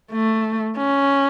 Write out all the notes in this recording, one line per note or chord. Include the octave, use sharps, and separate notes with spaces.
A3
C#4